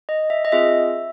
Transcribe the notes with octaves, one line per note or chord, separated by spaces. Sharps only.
D#5
E5
D#5
C4 F4 G#4 E5